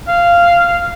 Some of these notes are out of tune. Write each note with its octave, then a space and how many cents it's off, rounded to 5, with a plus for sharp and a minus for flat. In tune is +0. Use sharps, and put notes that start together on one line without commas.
F5 -10